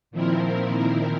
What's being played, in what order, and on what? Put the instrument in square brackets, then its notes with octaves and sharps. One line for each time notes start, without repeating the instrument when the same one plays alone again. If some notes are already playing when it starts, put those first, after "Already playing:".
[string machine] A#2 D#3 F3 C4 E4 A#4